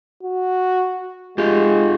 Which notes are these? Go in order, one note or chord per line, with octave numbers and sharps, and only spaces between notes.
F#4
G#3 F4 G4